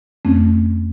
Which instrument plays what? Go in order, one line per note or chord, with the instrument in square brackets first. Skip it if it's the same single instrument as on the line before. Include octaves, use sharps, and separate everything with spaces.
[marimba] F2 A3 C4 C#4